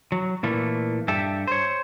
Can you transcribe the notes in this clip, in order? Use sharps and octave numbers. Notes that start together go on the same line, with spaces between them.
F#3
A#2 E3 A3 A#3
G2 G4 A4 E5
C5 C#5